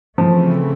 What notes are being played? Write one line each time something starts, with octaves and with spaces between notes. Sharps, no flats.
C#3 E3 F3 A3 C4